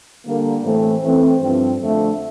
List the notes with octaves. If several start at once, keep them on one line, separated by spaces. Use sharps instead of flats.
D3 G3 A#3
A2 E3 A3 C4
E3 A3 C4
G2 F3 C4
F2 D3 A3